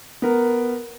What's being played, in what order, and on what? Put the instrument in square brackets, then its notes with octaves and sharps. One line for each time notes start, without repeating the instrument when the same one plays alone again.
[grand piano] B3 A#4